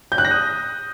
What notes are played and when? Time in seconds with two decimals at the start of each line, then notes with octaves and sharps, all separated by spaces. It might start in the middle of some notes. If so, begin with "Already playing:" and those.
0.12 G6
0.18 F#6
0.25 A#6
0.31 D#6